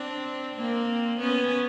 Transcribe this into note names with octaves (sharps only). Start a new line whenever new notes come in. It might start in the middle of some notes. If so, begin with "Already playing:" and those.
Already playing: C4 D4
A#3 C4
B3 C#4